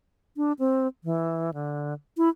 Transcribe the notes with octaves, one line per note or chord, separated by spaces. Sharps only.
D4
C4
E3
D3
E4